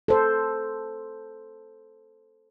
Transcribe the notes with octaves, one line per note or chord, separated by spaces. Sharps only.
A4 C5